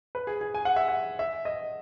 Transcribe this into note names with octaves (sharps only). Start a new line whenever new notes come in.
B4
G#4
G#4
G#5
F#5
E5
F#5
E5
D#5